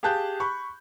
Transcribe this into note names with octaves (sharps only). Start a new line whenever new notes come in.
G4 G#4 F5 A5 F#6 G6
B5 C#6